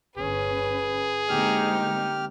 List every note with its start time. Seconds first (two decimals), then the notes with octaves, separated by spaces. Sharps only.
0.18 G1 C#4 G#4 B4
1.29 D3 G#3 A#3 C4 D#4 G4 F6